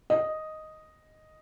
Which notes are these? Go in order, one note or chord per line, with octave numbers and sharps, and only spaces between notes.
D#5